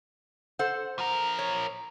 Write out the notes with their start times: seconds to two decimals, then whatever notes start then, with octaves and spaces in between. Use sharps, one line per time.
0.59 A4 C5 F#5
0.99 F3 A#4
1.39 C#5